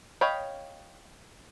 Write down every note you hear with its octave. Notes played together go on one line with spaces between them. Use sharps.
C#5 D#5 F5 G5 B5